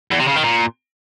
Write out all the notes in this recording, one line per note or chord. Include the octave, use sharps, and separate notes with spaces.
E2
C3
C#3
D#3
A#2